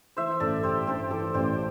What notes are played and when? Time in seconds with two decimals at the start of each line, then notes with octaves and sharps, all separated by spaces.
0.17 E3 C5 E5
0.40 A1 A4 D5
0.63 A1 G4 C5
0.87 G2 G4 C5
1.11 E3 A4 D5
1.34 A1 G4 C5